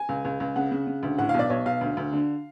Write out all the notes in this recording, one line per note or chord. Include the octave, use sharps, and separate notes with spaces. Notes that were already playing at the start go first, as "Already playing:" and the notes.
Already playing: G#5
C#2
C#2
C#2
C#3 F#5
C#3
C#3
D2
A2 F#5
B1 F5
D5
B1 C#5
B1 F5
D2
D2
D3